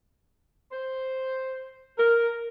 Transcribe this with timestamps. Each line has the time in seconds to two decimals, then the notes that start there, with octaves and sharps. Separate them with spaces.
0.72 C5
1.98 A#4